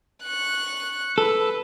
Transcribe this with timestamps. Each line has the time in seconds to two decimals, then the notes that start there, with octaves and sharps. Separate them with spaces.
0.24 C#6 F#6
1.18 A4 B4